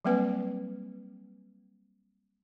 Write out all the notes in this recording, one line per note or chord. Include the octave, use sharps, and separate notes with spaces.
F#3 G3 A#3 C4 B4 G#5